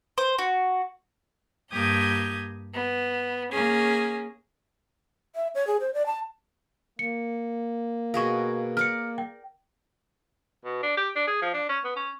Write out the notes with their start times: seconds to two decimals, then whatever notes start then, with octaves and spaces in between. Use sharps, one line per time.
0.18 C5
0.38 F#4
1.73 G2 A#3 G4 D#6 G6 G#6
2.74 B3
3.51 A#3 C#4 G#4
5.35 E5
5.55 C#5
5.67 G#4
5.80 C5
5.94 D5
6.06 A5
6.99 A#3 C#7
8.14 B2 G#4 A#4 F5 C#6
8.77 A#4 D5 F6 C#7
9.18 G5
10.65 B2
10.83 D4
10.97 G4
11.16 D4
11.27 G#4
11.42 F3
11.54 D4
11.69 C#4
11.84 B3
11.96 C#4